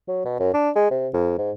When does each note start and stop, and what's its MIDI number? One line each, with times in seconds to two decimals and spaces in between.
0.08 0.22 54
0.25 0.38 47
0.39 0.51 42
0.54 0.70 62
0.75 0.89 56
0.91 1.08 48
1.13 1.34 41
1.38 1.51 44